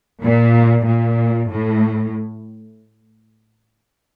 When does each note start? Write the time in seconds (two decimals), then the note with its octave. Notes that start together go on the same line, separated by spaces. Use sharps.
0.23 A#2
0.85 A#2
1.50 A2